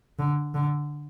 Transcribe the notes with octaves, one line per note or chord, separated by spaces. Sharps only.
D3
D3